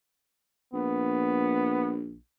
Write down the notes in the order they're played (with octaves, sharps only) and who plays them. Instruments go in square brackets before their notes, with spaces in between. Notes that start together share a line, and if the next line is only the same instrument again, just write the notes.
[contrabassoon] A#1 [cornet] B3